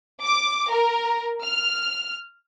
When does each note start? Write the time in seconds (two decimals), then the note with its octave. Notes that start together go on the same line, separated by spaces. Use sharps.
0.23 D6
0.72 A#4
1.43 F6